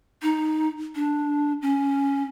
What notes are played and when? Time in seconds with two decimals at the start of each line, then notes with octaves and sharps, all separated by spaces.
0.22 D#4
0.95 D4
1.62 C#4